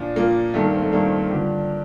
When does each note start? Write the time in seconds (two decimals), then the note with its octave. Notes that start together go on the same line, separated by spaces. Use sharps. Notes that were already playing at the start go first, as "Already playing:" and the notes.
Already playing: A#2 F3 D4
0.16 A#2 F3 A#3
0.54 G2 D#3 A3
0.64 A#3
0.74 C4
0.82 A3
0.92 G2 D#3 A#3
1.05 C4
1.18 C4
1.30 G2 D3 F3 G4